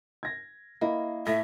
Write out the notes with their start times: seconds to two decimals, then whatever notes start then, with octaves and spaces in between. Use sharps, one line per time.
0.23 G#6 A#6
0.81 A#3 E4 D#5 B5
1.27 A2 E5 A#6